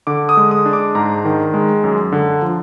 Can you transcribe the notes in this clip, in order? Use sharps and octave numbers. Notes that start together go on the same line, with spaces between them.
D3 D6
D#6
G#3
D#6
D4
D6
G#2 A#5
D#3
G#3
F#2
D3
F3